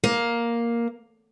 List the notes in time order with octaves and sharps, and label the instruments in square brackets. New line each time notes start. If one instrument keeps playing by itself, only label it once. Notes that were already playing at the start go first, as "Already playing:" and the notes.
[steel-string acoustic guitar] A#3